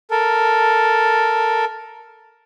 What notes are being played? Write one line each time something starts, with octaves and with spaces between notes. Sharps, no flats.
A4 A#4